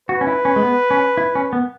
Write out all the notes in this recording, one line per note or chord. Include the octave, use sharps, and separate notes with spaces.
F#4 B4
C#4
E4
C#4
G#3
B3
C#4
E4
C#4
B3